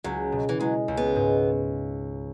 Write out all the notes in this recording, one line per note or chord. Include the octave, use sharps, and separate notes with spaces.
C#2 F#3
B2
E3
F#3 G#3
C#2
B3
G#2